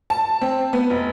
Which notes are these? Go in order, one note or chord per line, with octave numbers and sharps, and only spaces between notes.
A5
C4
B3
F1